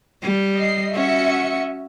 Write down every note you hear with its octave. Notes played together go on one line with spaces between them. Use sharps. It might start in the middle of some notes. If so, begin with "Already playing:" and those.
G3
D#5 C7
C#4 F#4 E5 C#7